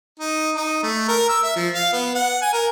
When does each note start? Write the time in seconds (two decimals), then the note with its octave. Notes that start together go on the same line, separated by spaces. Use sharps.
0.19 D#4
0.56 D#4
0.83 A3
1.08 A#4
1.29 E6
1.43 E5
1.56 F3
1.74 F5
1.93 B3
2.15 F#5
2.42 G#5
2.53 A#4